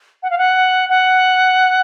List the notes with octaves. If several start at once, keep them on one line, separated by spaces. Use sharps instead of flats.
F#5
F5
F#5
F#5